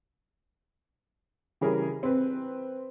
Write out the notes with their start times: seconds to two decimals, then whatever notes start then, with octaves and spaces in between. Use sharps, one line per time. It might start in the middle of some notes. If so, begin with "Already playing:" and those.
1.61 C#3 E3 G3 C#4 G#4 A#4
2.03 C4 B4